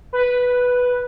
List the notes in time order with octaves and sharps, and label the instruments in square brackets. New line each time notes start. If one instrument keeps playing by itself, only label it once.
[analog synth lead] B4